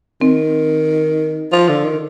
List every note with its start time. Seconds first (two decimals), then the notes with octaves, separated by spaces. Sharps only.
0.21 D#3 C4
1.52 F3
1.69 D3
1.84 D#3